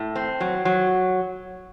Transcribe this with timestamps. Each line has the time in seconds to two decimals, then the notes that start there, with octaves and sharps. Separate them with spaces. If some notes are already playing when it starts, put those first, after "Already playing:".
Already playing: A2
0.16 C4
0.40 F#3
0.65 F#3